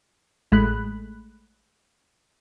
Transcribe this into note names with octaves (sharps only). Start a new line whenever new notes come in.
A1 G#3 A3 B5 F#6